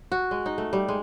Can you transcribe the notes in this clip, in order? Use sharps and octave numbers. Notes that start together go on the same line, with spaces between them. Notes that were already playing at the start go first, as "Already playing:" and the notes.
F#4
G#3
D#4
A3
G3
G#3